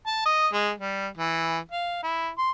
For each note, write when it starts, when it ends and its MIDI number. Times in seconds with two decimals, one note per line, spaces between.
0.07 0.21 81
0.25 0.48 75
0.53 0.71 56
0.79 1.07 55
1.17 1.58 52
1.72 1.98 77
2.03 2.29 64
2.38 2.51 84